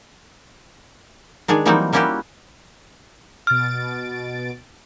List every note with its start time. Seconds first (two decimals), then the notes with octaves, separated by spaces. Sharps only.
1.48 D#3 G#3 D4 G#4
1.65 E3 F#3 G3 A#3 C4 D#4
1.93 G3 A#3 C#4 E4 F#4 G4
3.47 B2 F6 A6 D7